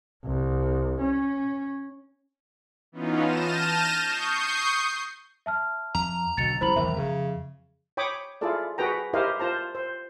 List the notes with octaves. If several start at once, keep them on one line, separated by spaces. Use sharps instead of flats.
C2
C#4
E3 B3 C#4 D#4 F4
A5 F6 G6 A#6 D#7 E7
C#6 D#6 G6 C7
E5 A5 F6
F2 A#5
B1 B2 D3 A6 C#7 F7
F2 C#3 G3 E4 C5 B5 F#7
B1 E2 G#2 D#3 E5
F2 C#3
C#5 G5 B5 D6 D#6
E4 F4 G#4 A4 D5
F#4 G#4 B4 G5 A#5
E4 G4 A#4 C5 D#5 F5
F4 C5 A5 A#5
C5